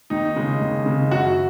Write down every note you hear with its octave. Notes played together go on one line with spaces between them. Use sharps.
D#2 D#4
C#3 G#3
D#2
C#3 G#3
F#2 F#4